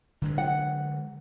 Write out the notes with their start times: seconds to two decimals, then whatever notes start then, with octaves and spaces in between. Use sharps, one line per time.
0.22 D3 F#3 G#3
0.38 F#5